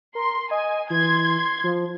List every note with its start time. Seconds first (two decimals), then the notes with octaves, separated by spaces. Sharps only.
0.15 A#4 C6
0.51 D#5 G#5
0.90 E3 C6 G#6
1.64 F3